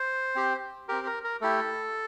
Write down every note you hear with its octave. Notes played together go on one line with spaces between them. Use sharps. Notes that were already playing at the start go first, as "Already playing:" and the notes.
Already playing: C5
C4 G4
C4 G4 A#4
A#4
A#4
A3 E4 G4 A4